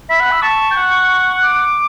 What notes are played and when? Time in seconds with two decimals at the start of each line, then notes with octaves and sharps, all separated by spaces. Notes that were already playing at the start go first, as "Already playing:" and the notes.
0.09 E5 B5
0.20 F#5
0.32 E6
0.42 A5 C#6
0.71 G5
0.76 F#5
1.42 D6